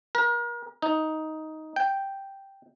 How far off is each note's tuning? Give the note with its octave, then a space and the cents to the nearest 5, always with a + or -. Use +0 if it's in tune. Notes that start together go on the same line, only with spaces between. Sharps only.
A#4 +35
D#4 +10
G5 +0